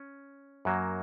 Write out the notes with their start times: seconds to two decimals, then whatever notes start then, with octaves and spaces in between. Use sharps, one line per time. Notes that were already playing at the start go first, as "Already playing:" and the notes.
Already playing: C#4
0.65 F#2 F#3 A#3